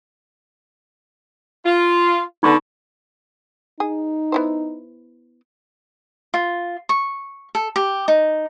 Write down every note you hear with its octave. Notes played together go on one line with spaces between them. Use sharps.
F4
D3 B3 D#4 B5 C#6
D#4 G#4
B3 E4 C5
F4
C#6
A4
G4
D#4